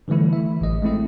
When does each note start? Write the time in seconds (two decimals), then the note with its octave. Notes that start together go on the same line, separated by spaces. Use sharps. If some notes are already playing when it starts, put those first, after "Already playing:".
0.08 D3 E3 G3 A3 E4
0.33 E5
0.61 A1 D#5
0.82 G#3 A3 C4 E4 D#5